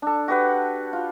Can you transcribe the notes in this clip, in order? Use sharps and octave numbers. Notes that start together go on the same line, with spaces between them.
D4 A4
F#4 G4 B4 F#5
F4